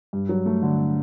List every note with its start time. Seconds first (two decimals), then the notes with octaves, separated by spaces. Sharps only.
0.13 G2
0.29 F#3
0.46 A3
0.63 D3